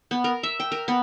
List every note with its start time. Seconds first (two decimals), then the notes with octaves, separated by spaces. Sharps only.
0.11 B3
0.24 A#4
0.43 E5
0.60 G5
0.72 A#4
0.88 B3